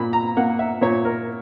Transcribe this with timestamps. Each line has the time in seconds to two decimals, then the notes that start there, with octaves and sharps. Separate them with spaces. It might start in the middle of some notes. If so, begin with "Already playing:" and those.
Already playing: A#2 B5
0.13 A#5
0.37 A#3 F#5
0.59 E5
0.81 A#2 C#5
1.05 A#4